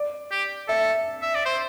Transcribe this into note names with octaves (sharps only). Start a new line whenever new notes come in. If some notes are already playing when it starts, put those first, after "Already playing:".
Already playing: D5
G4
A4 E5
E5
D5
C5